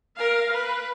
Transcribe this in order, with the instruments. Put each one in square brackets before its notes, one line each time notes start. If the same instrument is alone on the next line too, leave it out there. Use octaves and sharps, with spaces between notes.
[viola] A#4 F5
B4